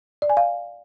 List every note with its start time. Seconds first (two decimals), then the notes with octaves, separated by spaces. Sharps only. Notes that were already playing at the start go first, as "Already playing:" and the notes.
0.22 D5
0.30 G#5
0.37 F5